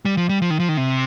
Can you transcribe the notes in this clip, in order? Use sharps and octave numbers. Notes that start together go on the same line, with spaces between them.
G3
F3
G3
F3
D#3
F3
D#3
C3